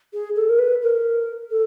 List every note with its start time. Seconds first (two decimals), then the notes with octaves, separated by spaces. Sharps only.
0.13 G#4
0.36 A4
0.49 A#4
0.58 B4
0.82 A#4
1.51 A4